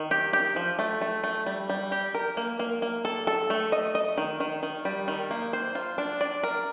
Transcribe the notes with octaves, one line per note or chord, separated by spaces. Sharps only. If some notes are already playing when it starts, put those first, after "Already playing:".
Already playing: D#3
G4
G4
F3
A3
A3
A3
G3
G3
G4
A#4
A#3
A#3
A#3
A4
A4
A3
D#5
D#5
D#3
D#3
D#3
G3
D#3
A#3
C5
F4
D4
D5
A#4